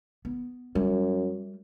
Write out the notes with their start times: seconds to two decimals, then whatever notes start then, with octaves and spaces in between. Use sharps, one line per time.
0.25 B3
0.75 F#2 G3